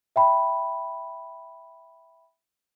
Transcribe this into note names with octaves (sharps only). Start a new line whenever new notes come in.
E5 G5 B5